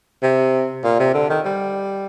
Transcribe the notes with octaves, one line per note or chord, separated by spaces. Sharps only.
C3
A#2
C3
D3
D#3
G3